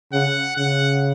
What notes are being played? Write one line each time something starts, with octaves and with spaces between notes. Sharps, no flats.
C#3 F#5
C#3 F#5